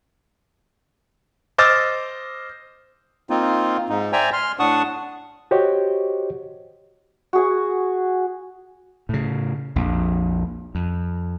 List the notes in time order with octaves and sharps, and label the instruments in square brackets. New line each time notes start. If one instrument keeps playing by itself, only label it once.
[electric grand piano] C5 D#5 D6 E6 F6 A6
[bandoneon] A#3 C4 D#4 F4
G#2 D#4
C5 D5 E5 G5 G#5 A#5
C6 F6
A2 D4 F#5 A5 C#6 D#6
[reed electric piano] F#4 G4 C5 C#5 D#5
[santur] F#4 G#4 G#5
[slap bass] A2 C#3
A#1 F2
F2